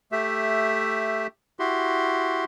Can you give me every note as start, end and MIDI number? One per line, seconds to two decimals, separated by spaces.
0.12 1.27 57
0.12 1.27 67
0.12 1.27 76
1.59 2.44 64
1.59 2.44 66
1.59 2.44 67
1.59 2.44 84